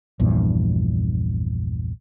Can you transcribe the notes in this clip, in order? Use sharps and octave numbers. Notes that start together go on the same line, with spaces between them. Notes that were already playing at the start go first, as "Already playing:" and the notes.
A#1 E2 G2 A#2